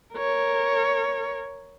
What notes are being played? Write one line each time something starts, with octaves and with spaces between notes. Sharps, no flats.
A#4 C#5